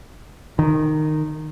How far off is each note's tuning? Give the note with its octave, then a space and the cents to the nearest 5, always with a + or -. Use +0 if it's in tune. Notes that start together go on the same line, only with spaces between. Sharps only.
D#3 -15